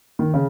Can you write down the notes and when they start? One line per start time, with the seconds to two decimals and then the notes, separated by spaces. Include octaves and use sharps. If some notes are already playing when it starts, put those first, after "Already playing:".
0.19 D#3
0.34 C#3